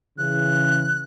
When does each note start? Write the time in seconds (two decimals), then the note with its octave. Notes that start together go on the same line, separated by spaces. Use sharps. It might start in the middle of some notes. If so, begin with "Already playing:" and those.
0.18 C#3 E3 F#6